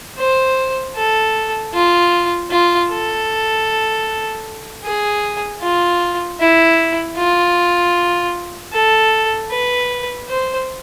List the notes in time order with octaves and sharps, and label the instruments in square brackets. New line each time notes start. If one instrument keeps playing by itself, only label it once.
[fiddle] C5
A4
F4
F4
A4
G#4
F4
E4
F4
A4
B4
C5